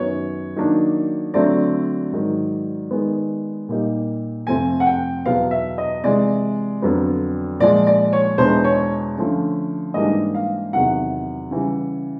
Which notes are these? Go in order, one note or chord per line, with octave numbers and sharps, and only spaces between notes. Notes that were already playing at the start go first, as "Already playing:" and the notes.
Already playing: F#2 D#3 F#3 B3 C#5
D#3 F#3 A#3 D4
D3 F#3 A3 C4 D5
G#2 D#3 F#3
D#3 G#3 B3
A#2 G3 A#3 D#4
F2 C3 F3 A3 C4 G#5
F#5
G5
E2 B2 F#3 B3 F5
E5
D#5
C3 E3 G#3 D5
F2 D3 F#3 B3
A#2 F3 G#3 D5
D5
C#5
E2 B2 G#3 B3 D4 C5
C#5
D3 F3 A3 C#4
G#2 E3 G3 A#3 D4 D#5
F5
E2 C3 D#3 F#3 F#5
C#3 E3 G3